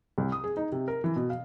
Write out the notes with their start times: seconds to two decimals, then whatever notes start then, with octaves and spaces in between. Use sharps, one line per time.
0.18 C2
0.32 D#6
0.44 G#4
0.57 D#4
0.72 C3
0.88 A#4
1.04 E3
1.16 B2
1.30 F5